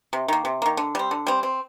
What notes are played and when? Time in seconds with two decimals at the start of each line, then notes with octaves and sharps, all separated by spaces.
0.13 C3
0.28 D#3 A#3
0.45 C3
0.62 D#3 A#3
0.77 D3
0.95 G3 C4
1.11 D3
1.27 G3 C4
1.43 C4